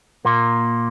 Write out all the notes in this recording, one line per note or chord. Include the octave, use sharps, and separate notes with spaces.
A#2 A#3